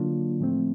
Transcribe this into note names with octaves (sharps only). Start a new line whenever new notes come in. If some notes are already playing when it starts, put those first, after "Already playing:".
Already playing: D3 F#3 A#3 D4 F4
A2 F3 A3 C4